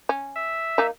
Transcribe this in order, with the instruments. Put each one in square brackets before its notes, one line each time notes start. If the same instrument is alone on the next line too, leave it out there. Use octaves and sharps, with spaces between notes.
[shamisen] C#4
[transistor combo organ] E5
[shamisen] A#3 D#4